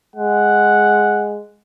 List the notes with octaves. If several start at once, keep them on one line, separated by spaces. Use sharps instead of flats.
G#3 F#5